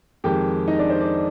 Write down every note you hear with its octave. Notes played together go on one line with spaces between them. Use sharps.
F2 D#3 G#3 G4 G5
D#4 D#5
D4 D5
C5
D4 D5